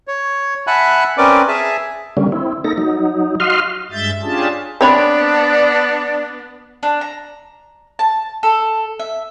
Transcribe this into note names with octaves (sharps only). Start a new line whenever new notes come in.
C#5
E5 F#5 G#5 A5 B5 F#6
C4 C#4 A#4 B4 D5 D6
G#4 E5 G#5 A5
D3 G3 A#3 C#4
C4 E4
A#3 D#4 A4 A#6
F#3 D#4
F#4 D#5 F5 C6 F6
G2 G#3 E5 G6 A6
C#4 D4 F4 G4 G#4 A5
B3 C4 D4 C#5 D5 B5
D4
A#5
A5
A4
E5